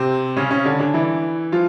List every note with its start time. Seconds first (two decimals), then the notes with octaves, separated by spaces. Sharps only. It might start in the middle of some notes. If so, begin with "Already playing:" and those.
Already playing: C3 C4
0.36 C#3 C#4
0.50 C#3 C#4
0.65 D3 D4
0.79 D3 D4
0.94 E3 E4
1.52 F3 F4